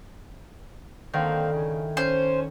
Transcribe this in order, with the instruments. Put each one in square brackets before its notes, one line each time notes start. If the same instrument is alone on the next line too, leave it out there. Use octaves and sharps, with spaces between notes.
[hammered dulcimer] D3 [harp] D#3 [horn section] A#3 C4 F5
[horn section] C#3 [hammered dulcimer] E4 G#5
[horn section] C#4 [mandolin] C5 [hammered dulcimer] A5